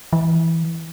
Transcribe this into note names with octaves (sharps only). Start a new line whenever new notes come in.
E3